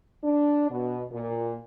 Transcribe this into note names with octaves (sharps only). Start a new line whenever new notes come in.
D4
B2
A#2